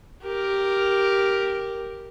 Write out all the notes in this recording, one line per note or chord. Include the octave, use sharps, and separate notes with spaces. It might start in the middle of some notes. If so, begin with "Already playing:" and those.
G4 A#4